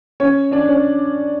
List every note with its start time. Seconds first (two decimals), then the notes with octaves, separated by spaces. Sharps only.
0.20 C#4 C#5
0.51 D4 D5
0.68 C#4 C#5